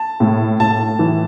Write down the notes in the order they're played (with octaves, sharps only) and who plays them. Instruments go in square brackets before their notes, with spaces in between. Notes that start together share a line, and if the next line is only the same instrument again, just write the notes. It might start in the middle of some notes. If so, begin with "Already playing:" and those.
Already playing: [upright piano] A5
[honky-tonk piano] A2
[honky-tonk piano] A2 [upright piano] A5
[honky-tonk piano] E3